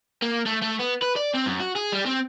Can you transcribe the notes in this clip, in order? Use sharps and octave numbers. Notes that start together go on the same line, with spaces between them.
A#3
A3
A3
B3
B4
D5
C4
F#2
F#4
G#4
G3
C4